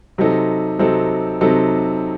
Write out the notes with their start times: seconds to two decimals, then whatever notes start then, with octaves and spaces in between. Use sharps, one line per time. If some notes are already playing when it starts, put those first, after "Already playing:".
0.18 C3 F#3 C4 D#4 A4
0.79 C3 F#3 C4 D#4 A4
1.41 C3 F#3 C4 D#4 A4